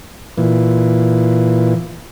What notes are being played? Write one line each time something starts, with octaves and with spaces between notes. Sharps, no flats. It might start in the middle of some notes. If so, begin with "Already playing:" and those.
A#2 E3